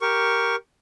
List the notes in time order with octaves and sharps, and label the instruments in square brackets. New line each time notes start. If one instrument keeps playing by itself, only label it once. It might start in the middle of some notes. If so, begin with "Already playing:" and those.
[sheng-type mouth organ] G4 A#4 C#6